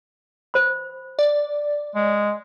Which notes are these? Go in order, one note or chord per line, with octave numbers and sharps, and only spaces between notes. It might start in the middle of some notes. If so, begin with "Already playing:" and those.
C5 B5
D5
G#3